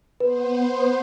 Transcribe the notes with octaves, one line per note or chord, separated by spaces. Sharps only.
B3 B4 C5